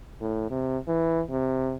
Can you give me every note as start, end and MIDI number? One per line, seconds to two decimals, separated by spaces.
0.21 0.46 45
0.51 0.78 48
0.88 1.21 52
1.30 1.77 48